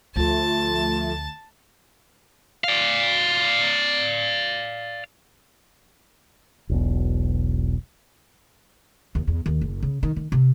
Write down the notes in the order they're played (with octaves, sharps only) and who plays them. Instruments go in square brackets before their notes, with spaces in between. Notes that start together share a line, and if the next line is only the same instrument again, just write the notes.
[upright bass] D2 [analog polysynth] F3 A3 [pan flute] F4 [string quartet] A5
[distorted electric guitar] D5 F5
[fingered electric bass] E1 B1 B2
[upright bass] D#2
E2
D#2
F#1
C#3
D#3
D#3
C3